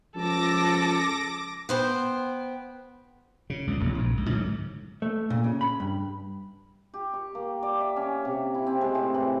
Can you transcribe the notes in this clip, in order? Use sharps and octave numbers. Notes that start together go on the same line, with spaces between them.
C#2 F3 A4 D6 A#6
B3 C5 G5
C#3
C#2 A#2
E1 A1
A#1 G#2
C#2
G#2 D3 E3 F#3
A3
A#2
C#3
B5
G2
G4
C#6
A#3
D5
E5
C#4
C3
E4
C4
G#3
A2
E3